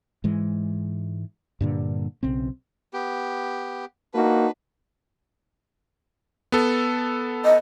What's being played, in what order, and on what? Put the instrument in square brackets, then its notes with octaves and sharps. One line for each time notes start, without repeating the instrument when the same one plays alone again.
[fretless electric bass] G#2 E3 G#3
G2 A#2 D3
B1 C#3 C4
[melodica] B3 G4
[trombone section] A#3 D#4 F#4 [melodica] D4 B4
[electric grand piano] B3 A4
[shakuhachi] D#5